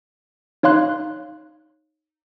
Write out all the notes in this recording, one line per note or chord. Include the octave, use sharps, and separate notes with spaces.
D#4 C#5 F5 C6 F#6